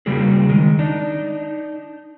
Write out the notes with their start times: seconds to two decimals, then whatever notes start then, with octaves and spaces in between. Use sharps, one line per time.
0.06 C#3 G3 A#3 F#4 G#4
0.49 D#3 G#3
0.79 D4 D#4